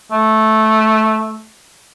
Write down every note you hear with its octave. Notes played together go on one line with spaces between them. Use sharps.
A3